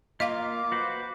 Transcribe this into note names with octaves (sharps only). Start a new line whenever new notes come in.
A#3 F4 D#5 F5 D6
F#4 B4 C5